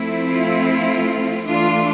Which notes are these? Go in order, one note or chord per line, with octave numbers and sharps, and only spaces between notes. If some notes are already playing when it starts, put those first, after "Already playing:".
Already playing: F3 A3 C4 E4
F4
E3 A3 D4 F4